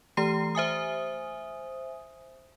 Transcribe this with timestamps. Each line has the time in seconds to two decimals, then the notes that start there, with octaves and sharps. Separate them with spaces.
0.17 E3 A3 G4 A#5 C7
0.55 C5 E5 G#5 D#6